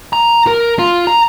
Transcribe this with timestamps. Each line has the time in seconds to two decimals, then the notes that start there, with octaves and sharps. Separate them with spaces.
0.13 A#5
0.47 A#4
0.79 F4
1.07 A#5